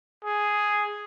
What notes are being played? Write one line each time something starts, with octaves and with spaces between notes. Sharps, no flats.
G#4